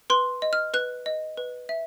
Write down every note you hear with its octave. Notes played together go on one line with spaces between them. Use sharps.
B4 C6
D#5
F6
B4 F#6
D#5
B4
E5